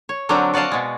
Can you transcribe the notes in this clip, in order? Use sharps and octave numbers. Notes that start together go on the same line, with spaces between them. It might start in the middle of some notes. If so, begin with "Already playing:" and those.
C#5
D3 F#3 C4 D4 A#4 G5
F#4 D5 D#5 F5 A5
B2 G#3